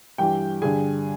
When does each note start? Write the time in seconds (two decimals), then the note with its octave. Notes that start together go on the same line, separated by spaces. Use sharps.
0.18 G2 E3 G4 G5
0.62 G2 D3 G#4 G#5